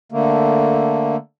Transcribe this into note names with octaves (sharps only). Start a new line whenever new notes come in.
D3 A3 A#3